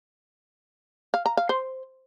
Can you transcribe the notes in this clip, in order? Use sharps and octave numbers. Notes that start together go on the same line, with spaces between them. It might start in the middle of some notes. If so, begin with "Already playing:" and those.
F5
A#5
F5
C5